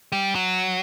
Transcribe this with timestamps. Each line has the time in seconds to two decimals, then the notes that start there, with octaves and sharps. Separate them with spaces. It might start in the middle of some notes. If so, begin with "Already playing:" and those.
0.12 G3
0.35 F#3